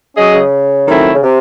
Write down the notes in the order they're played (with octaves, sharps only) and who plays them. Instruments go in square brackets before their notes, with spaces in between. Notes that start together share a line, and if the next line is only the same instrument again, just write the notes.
[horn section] F#3 C#4 G#4 D#5
[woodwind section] C#3
[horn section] D#3 F#3 A3 C4 E4
[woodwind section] C#3
C3